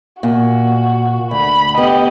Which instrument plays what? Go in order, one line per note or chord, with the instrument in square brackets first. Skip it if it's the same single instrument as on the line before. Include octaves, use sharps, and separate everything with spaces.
[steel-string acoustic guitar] A#2 [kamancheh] F#4
[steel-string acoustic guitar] D2 [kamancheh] B5
[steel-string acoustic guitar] B3 [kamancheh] G4 D#5